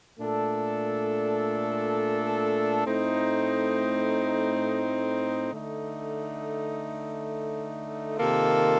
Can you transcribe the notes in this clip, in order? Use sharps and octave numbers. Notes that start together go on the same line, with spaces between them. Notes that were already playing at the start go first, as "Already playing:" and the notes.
A#2 A3 D4 A4
A2 A3 C4 D#4
D3 A3 D#4
C3 D#3 A#3 F4 A4